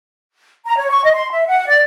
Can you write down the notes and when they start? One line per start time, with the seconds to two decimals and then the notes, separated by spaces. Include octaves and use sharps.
0.65 A#5
0.77 C#5
0.90 C#6
1.04 D#5
1.15 C6
1.31 E5
1.47 F#5
1.68 D5